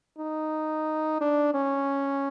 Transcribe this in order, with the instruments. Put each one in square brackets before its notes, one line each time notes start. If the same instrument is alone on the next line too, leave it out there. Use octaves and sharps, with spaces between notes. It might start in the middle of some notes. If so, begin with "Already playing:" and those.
[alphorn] D#4
D4
C#4